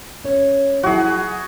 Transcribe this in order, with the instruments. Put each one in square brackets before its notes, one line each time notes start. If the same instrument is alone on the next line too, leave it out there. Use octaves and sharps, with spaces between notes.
[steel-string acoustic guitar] C#4 C#5
[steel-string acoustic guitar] F3 F#3 E4 [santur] F#4 G#4